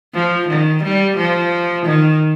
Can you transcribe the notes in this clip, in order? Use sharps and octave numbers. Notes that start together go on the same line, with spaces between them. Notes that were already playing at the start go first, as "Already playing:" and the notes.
F3
D#3
G3
F3
D#3